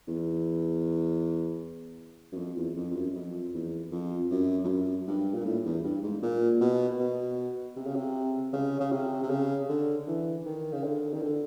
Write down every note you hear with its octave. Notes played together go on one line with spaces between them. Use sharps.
E2
F#2
F2
E2
F2
F2
F#2
F2
E2
F2
F#2
F2
F#2
G2
A#2
A2
E2
G2
G#2
A#2
B2
B2
C3
C#3
C3
C#3
C#3
C3
C3
C#3
D3
E3
D#3
C#3
D3
D#3
D3